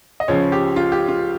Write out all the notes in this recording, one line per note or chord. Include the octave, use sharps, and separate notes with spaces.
D#5
C#2 C#3 F3 C#5
G4
F4
G4
F4